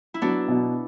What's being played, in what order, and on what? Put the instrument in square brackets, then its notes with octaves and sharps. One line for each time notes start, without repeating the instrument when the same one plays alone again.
[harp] E4
[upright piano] F#3 [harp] B3 D4
[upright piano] B2